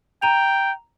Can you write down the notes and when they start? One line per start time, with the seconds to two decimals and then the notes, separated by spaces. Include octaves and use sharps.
0.22 G5 A#5 F7